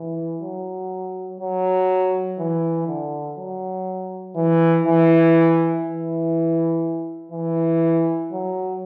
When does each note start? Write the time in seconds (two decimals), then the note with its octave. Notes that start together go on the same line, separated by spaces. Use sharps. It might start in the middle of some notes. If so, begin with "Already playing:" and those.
Already playing: E3
0.41 F#3
1.40 F#3
2.39 E3
2.87 D3
3.37 F#3
4.35 E3
4.85 E3
5.84 E3
7.32 E3
8.32 F#3